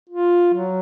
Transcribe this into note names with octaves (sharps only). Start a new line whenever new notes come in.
F4
F#3